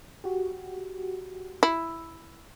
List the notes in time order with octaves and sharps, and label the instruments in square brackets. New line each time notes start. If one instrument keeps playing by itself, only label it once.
[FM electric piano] F#4 G4
[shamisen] E4